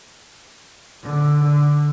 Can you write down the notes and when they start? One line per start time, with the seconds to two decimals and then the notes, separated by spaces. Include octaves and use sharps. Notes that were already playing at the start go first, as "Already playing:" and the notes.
1.03 D3
1.43 D3